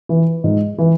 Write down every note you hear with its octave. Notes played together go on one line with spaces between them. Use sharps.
E3
G#2
E3